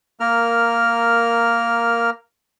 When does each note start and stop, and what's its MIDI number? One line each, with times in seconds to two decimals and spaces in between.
0.20 2.10 58
0.20 2.10 70
0.20 2.10 89